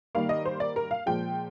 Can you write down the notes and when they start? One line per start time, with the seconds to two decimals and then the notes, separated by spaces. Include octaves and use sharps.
0.15 D#3 G3 A#3 F5
0.29 D#5
0.46 C5
0.60 D5
0.76 A#4
0.91 F5
1.06 A#2 F3 G#3 G5